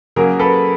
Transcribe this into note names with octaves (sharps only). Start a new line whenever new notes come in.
C#3 F#3 A#3 G#4 A#4
A4 B4